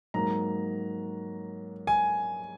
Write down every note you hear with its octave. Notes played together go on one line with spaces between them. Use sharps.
G#2 F#3 A#3 A#5
G#5